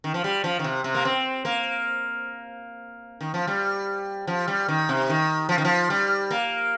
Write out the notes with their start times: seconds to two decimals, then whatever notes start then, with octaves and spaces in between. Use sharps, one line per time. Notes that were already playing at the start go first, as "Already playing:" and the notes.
0.04 D#3
0.14 F3
0.24 G3
0.44 F3
0.59 D#3
0.64 C3
0.84 C3
0.95 A#3
1.05 C4
1.45 A#3
3.21 D#3
3.34 F3
3.47 G3
4.27 F3
4.48 G3
4.68 D#3
4.89 C3
5.09 D#3
5.49 F3
5.58 D#3
5.65 F3
5.90 G3
6.31 A#3